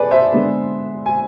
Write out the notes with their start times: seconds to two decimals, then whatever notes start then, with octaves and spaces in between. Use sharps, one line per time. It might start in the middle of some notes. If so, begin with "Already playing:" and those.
Already playing: G#4 A4 B4 D5
0.11 C5 E5
0.33 D3 G#3 B3
1.06 G#5